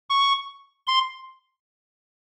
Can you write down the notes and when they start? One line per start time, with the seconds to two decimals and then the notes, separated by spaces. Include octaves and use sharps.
0.10 C#6
0.87 C6